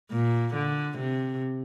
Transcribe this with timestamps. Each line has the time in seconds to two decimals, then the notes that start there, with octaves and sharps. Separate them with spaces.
0.11 A#2
0.55 D3
0.98 C3